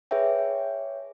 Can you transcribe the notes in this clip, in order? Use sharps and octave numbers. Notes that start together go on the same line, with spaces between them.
G#4 B4 C#5 E5 G5